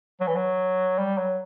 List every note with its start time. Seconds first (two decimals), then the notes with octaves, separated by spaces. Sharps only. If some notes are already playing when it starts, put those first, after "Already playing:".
0.21 F#3
0.27 E3
0.36 F#3
0.98 G3
1.18 F#3